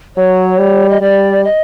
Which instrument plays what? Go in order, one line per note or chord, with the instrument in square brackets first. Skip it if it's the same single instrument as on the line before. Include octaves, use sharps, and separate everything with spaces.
[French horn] F#3 [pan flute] C#5
[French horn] G3
[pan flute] D#5
[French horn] G3 [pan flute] D5
[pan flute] D#5